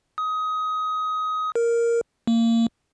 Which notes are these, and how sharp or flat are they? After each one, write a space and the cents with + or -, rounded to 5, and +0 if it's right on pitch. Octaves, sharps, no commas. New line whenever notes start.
D#6 +20
A#4 +0
A#3 -25